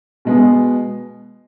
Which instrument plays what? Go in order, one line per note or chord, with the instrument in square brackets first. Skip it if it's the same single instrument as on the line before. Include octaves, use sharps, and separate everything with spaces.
[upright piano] B2 G#3 B3